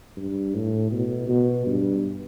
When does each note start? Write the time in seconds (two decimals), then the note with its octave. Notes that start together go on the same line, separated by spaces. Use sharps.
0.17 G2
0.54 A2
0.92 B2
1.29 B2
1.66 G2